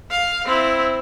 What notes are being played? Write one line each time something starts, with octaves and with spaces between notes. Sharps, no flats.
F5
C4 E4